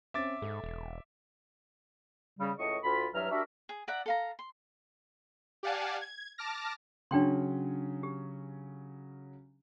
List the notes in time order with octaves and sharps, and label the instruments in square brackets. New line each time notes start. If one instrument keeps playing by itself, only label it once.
[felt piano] C4 C#4 C5 [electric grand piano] E5 D6 A6
[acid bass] G#2 [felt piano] A4
[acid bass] E1
[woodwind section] C#3 G3
C#2 A2 D#5 C#6
D2 F4 B5
G2 E3 F#3 E5 A#5 F6
G3 D4 F#4 A#4 E5
[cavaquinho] G#4
D5 E5 F#5 A#5
A4 F5 A#5
C6
[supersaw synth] G4 D5 F5 F#5 G#5 A5
G#6
A5 D6 F6 A#6
[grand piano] C#3 F#3 C#4 [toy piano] D4 G5 C6
[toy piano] G4